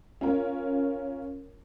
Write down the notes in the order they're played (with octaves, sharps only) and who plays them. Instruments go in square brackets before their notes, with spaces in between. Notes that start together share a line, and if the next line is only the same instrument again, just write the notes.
[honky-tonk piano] C#4 F4 A#4 C#5